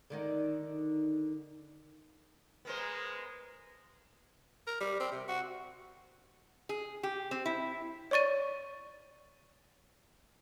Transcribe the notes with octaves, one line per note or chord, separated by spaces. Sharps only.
D3 D#3 D#4
G#3 B3 A#4 C5
A#4
G3
C4
C3
F#4
G#4
G4
C4
E4
C#5 D5 C#6 A6 D#7